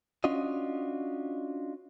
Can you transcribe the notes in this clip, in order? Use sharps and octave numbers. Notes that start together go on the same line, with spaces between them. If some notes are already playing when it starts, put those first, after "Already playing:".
C#4 D4 F4 F#4 D#5